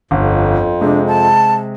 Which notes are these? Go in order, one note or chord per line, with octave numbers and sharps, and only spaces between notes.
G1 F2
C3 G#3 D4
A5